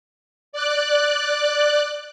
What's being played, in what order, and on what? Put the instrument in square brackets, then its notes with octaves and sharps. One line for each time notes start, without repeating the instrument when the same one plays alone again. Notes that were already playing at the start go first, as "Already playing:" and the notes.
[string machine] D5 F#6